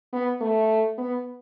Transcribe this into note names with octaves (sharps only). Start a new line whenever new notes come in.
B3
A3
B3